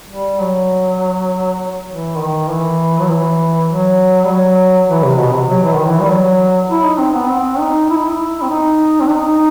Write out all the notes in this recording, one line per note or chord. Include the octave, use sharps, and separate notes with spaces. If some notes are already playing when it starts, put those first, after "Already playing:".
G3
F#3
E3
D#3
E3
F#3
E3
F#3
G3
F#3
E3
C3
B2
C3
F#3
E3
D#3
E3
G3
F#3
E4
D#4
C4
B3
C4
D#4
E4
D#4
E4
C4
D#4
C4
D#4